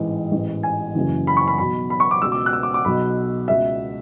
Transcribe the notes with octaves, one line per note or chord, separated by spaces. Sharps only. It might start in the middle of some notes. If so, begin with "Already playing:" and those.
Already playing: A1 G#2 E3
A1 G#2 E3
G#5
F#1 F#2 C#3 E3
B5
C#6
B5
B1 B2 B5
B5
C#6
D6
C#2 B2 E6
D6
F#6
E6
D6
D6
B1 B2 B5
C#2 B2 E5